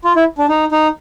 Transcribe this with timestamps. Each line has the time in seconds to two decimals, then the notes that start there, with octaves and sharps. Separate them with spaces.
0.05 F4
0.16 E4
0.38 D4
0.49 D#4
0.72 D#4